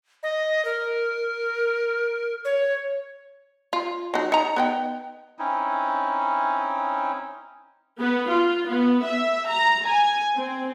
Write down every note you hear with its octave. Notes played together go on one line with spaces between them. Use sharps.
D#5
A#4
C#5
F4
F#3 D#4
D#4 A#5
B3 D#4 G5
C4 C#4 D#4 E4
B3
F4
B3
E5
A#5
G#5
C4